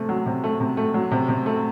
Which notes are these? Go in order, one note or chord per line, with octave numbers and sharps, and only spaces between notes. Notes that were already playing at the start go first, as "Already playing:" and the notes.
Already playing: C3 A3
F#3
C3
A3
C3
A3
F#3
C3
C3
A3